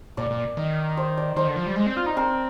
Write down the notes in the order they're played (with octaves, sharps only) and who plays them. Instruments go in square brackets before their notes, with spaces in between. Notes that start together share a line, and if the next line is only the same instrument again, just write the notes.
[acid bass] A#2 [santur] D5
[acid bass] A#2
D#3
[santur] C5
D5
[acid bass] D#3 [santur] C5
[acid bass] D3
F3
G3
G#3
C4
F4
D#4
[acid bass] C4 [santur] A#4